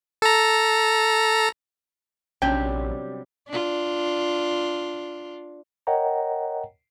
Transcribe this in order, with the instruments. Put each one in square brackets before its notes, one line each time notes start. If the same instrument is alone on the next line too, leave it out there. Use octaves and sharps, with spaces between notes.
[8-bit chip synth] A4 A#5
[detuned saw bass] A#1 [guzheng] C3 F#3 G3 [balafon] C#4 D4 [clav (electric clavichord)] G5
[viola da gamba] D4 F4
[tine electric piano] A#4 C#5 D#5 F#5 G5 A#5